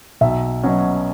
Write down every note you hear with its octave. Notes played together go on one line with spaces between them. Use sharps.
B1 E5
B2 F#3 C#4